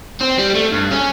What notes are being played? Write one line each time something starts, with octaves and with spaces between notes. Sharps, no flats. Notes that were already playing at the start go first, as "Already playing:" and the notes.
C4
G3
A3
G2
C#4